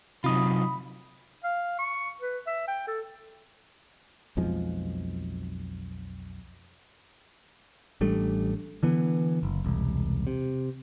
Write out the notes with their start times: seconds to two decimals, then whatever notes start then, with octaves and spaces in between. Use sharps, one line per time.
0.24 C3 F#3 D#4 F4 B5 D#6
1.44 F5
1.78 C#6
2.21 B4
2.47 E5
2.68 G5
2.87 A4
4.37 B1 F2 F3 G#3
8.01 A1 G3 A3 D4
8.83 D3 E3 B3
9.43 F#1
9.65 E1 C2
10.27 C3